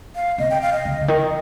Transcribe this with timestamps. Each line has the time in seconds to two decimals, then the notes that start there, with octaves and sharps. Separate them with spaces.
0.16 F5
0.38 C3 D#5
0.50 G5
0.62 F5
0.73 D#5
0.85 C#3
1.01 C#3
1.08 D#3